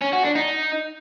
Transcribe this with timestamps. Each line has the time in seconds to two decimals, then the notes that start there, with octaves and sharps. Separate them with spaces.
0.01 C#4
0.13 F#4
0.24 D4
0.35 D#4